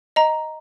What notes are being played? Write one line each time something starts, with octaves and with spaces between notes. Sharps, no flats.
D#5 A#5